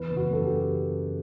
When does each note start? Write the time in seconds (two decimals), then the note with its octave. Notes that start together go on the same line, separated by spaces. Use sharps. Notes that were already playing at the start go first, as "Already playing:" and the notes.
Already playing: E2 E3 B4
0.10 F#1
0.17 F#4
0.31 F#2 A4
0.44 G4